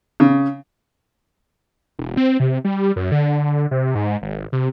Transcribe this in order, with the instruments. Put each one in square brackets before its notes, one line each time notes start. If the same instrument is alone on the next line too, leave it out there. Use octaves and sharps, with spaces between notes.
[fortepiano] C#3
[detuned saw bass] E1
C4
C3
G3
F#2
D3
C3
G#2
G#1
C3